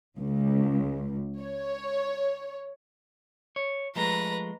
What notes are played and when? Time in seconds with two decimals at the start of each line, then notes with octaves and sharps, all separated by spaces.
0.17 C#2
1.42 C#5
3.56 C#5
3.96 F3 G#3 A3 B4 A#5